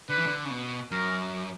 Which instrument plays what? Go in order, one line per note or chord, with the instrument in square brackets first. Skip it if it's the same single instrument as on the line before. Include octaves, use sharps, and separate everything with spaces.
[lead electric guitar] D3 [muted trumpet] B4
[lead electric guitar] E3
D3
C#3
B2
[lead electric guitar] F#2 [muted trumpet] A#4